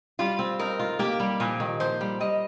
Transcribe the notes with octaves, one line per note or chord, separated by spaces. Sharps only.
G3 F4
C4
D#4 A#4
F4
A#3 G4
G3
A#2 F3
D#3
F3 C5
G3
G3 D#5